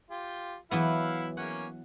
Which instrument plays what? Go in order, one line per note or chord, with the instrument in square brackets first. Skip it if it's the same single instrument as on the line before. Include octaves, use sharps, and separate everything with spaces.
[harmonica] F4 G4
[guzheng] E3 F#3 B3 [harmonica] E4 F5 F#5
[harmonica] A#3 C#4 [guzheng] F#5